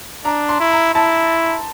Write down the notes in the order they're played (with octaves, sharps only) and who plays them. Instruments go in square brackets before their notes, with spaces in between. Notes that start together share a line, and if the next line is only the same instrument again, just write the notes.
[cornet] D4 [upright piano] A#5
[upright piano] C6
[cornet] E4
[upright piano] A#5
[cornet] E4 [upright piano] A5